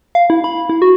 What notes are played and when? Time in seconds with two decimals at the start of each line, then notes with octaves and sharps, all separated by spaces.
0.15 F5
0.30 E4
0.44 B5
0.69 E4
0.82 F#4